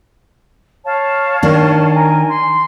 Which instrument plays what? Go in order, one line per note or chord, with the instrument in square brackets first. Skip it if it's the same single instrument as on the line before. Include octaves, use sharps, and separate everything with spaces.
[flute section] C#5 F5 A5
[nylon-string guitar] D#3 D4
[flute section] A#4 G#5
C6